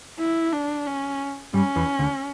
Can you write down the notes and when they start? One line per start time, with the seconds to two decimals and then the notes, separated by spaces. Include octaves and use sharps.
0.19 E4
0.52 D4
0.86 C#4
1.54 G2 G3 C#4
1.76 E2 E3
1.99 D2 D3